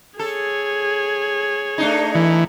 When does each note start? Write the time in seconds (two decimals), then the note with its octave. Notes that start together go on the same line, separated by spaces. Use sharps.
0.19 G#4 A4 C#5
1.78 A3 D4 D#4
2.15 E3